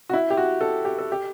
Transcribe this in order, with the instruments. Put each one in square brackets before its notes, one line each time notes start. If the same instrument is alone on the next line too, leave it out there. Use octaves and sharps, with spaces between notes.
[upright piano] F#4
E4
G4
F#4
A4
G4
A4
G4